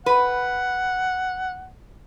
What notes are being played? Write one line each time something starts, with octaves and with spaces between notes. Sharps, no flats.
B4 F#5